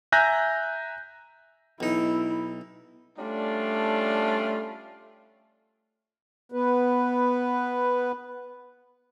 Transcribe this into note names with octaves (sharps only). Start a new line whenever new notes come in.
E5 G#5 A#5 F#6 G6 A#6
B1 D#4 E4
G3 A3 C#4 D4 F4
B3 B4